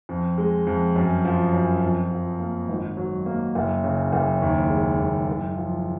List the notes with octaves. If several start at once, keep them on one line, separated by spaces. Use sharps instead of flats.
F2
G#3
F2
F#2
F3
F#2
F2
F3
A#3
G#1
F#3
A#3
F#1
C#3
F#1
D#2
G#3
D#2
F#1
F3